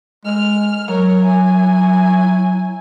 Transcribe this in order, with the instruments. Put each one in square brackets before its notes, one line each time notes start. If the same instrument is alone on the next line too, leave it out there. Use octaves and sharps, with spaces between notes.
[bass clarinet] G#3 [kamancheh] F6
[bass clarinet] F#3 [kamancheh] A#4 C#5
[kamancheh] E4 G#5